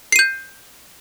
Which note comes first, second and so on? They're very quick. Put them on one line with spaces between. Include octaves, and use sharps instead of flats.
C7 D#7 G6